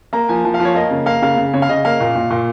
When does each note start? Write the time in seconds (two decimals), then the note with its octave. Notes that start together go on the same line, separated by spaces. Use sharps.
0.13 A#3 A#5
0.29 F3 G#5
0.45 F3
0.54 F5
0.60 F3
0.65 C#5
0.75 A#3 D#5
0.91 C#3
1.06 A#3 F5
1.22 C#3 F5
1.37 C#3
1.53 C#3 C#5
1.62 F5
1.69 C#3 D#5
1.85 A#3 F5
2.00 A#2
2.15 A#2
2.30 A#2